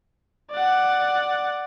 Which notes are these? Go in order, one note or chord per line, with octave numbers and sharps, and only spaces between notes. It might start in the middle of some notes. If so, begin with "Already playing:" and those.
D5 F#5